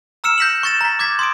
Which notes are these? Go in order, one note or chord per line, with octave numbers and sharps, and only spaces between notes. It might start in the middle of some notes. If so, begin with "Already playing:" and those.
A#5 E6 F6 C#7 E7
G6 A#6 B6 C#7 E7 F#7
C#6 G6 A6 A#6 E7
A#5 B6
D6 G6 G#6 B6
C6 D#6 D7